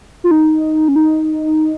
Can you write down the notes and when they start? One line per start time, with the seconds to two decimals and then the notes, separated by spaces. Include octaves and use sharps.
0.24 F4
0.31 D#4
0.88 C#4
0.96 D#4